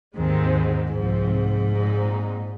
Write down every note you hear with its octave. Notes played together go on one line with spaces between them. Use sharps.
D#2 G#2 D#3 G#3 C4
C2 G#2 C3 F3 C4
A#2 G#3 C4 D#4